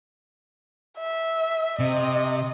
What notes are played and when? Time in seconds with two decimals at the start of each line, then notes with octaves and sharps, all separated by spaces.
0.99 E5
1.79 C3 D#5